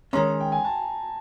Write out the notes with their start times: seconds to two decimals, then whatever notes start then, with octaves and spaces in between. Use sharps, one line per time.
0.13 D#3 G#3 C#4 A#5 C6
0.40 G5
0.52 G#5
0.64 A5